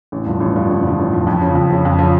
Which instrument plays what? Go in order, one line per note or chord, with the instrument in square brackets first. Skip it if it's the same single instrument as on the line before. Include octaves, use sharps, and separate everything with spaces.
[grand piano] A1
G2 F3
A1
G2 F3
A1
G2 F3
A1
G2 F3
F2
C#3 F3
F2
C#3 F3
F2
C#3 F3